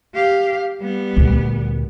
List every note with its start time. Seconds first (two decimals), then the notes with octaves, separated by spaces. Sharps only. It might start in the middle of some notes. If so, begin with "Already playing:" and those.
0.15 G4 F5
0.81 G3 B3
1.17 D2 A#2